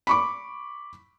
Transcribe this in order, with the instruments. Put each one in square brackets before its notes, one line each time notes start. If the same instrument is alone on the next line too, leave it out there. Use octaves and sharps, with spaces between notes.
[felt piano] B5 C#6 D6